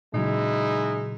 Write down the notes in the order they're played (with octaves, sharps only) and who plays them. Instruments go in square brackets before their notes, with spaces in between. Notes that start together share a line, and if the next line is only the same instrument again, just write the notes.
[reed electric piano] A#2 C#3 F#3 [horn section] G#3 D#4 E4